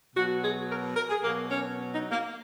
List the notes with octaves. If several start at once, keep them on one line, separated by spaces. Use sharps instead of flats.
B2 F#3 F#4
G#4
A#4
A#4
G#4
B2 F#3 A#3
C#4
D#4
A#3